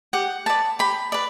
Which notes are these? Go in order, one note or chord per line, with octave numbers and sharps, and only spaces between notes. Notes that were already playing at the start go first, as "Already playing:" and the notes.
G4 F#5
B4 D5 A5
G4 B5
B4 D5